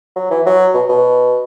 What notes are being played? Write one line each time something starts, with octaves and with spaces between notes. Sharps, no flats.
F#3
E3
F#3
B2
B2